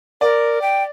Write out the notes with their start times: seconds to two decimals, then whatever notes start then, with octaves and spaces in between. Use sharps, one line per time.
0.21 A#4 D5
0.62 G5